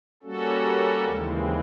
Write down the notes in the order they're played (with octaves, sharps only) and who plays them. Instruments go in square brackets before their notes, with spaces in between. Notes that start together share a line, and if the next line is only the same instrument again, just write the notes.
[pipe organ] G3 A#3 C#4 F#4 A4
D#2 C#3 E3 G#3 C4